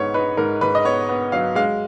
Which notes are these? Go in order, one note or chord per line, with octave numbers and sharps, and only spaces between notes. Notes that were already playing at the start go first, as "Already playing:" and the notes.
Already playing: G#2 B3 C#5
D#4 B4
G#2 A#4
G#2 B4
D#5
B3 C#5
B3
F#3 F5
G#3 F5